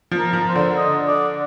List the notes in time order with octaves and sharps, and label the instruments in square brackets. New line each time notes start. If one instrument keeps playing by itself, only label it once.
[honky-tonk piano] F3
[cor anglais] A#4
[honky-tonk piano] F3
[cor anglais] C5
[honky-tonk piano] D3
[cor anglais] D#5
D5